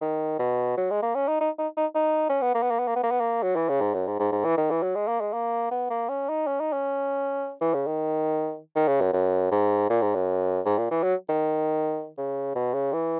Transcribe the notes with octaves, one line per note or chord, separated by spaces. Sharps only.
D#3
B2
F#3
G#3
A#3
C#4
D#4
D#4
D#4
D#4
D#4
C#4
B3
A#3
B3
A#3
B3
A#3
B3
A#3
B3
A#3
F#3
E3
C#3
G#2
F#2
G#2
G#2
G#2
E3
D#3
E3
F#3
G#3
A#3
G#3
A#3
B3
A#3
C#4
D#4
C#4
D#4
C#4
E3
C#3
D#3
D#3
C#3
F#2
F#2
G#2
A#2
G#2
F#2
G#2
A#2
E3
F#3
D#3
C#3
B2
C#3
E3